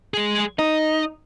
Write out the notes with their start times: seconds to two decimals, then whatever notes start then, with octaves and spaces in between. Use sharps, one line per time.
0.14 G#3 G#4
0.59 D#4 D#5